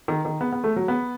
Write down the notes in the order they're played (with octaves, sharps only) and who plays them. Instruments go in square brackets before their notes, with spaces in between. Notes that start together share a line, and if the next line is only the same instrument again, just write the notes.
[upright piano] D#3
D#3
B3
B3
A3
F#3
B3